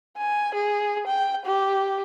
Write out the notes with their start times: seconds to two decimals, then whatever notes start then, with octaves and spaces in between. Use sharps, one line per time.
0.18 G#5
0.54 G#4
1.07 G5
1.45 G4